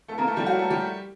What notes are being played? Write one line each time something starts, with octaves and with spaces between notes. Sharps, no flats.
A3 A4
A#3 A#4
A3 A4
G3 G4
F#3 F#4
A3 A4
G3 G4